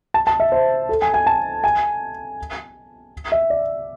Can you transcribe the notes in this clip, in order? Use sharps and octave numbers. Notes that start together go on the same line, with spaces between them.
A5
A5
E5
C5
A4
G#5
G#5
A5
G#5
E5
D5